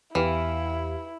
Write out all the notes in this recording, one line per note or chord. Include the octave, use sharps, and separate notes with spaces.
E2 E3 E4 G4 F5